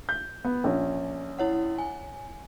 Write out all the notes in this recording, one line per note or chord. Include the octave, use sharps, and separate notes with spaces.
G6
B3
A#1 C#4
E4 C#5 F#5
G#5